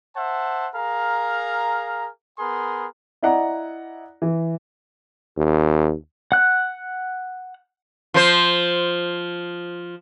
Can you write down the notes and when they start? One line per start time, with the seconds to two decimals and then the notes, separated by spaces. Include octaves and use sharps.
0.17 C5 E5 F#5 A5
0.76 G#4 A#4 F5 A#5
2.39 B3 G#4 A#4 C6
3.22 E4 D5 D#5 F#5 A#5
4.22 E3
5.37 D#2
6.32 F#5 F#6
8.14 F3 C5